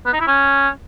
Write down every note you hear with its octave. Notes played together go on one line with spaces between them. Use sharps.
B3
D#4
E4
C#4